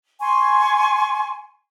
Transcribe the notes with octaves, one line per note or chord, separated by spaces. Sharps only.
G#5 C6 C#6